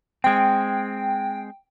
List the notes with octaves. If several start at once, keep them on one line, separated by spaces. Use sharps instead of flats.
G#3 C4 G5